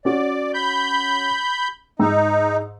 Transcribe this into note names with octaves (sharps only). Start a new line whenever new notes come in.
C#4 F#4 D5
B5 G6
G#2 D#4 A#5 E6